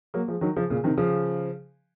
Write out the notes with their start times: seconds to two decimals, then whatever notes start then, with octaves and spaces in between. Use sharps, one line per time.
0.14 F#3 A#3
0.28 F3 G#3
0.41 D#3 F#3
0.56 C#3 F3
0.70 A#2 C#3
0.84 C3 D#3
0.97 C#3 F3